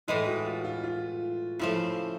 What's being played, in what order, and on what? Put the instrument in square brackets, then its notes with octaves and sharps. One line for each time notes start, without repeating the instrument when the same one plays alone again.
[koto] A2 E3 G#3 [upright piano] E4
[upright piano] F#4
F4
F4
F4
[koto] C#3 F3 A3 [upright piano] E4